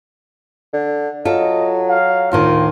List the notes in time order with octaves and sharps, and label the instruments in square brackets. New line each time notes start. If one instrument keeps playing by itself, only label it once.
[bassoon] D3
[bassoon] F#3 [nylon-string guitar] F4 A4 [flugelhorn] D#5
[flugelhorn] F5
[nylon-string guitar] D2 A2 D#3 [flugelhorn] F4